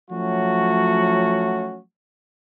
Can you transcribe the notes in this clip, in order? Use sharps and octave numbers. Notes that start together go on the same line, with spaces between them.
F3 F#3 A3 C#4 F#4